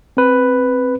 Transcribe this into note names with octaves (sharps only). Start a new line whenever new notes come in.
C4 B4